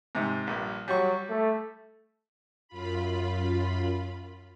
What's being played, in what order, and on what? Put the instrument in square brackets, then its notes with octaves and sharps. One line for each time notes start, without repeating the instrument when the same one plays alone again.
[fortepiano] G#2 C3
A#1 G2
[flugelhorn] F#3 [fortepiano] G3 C#6
[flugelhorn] A3
[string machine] F#2 F4 B5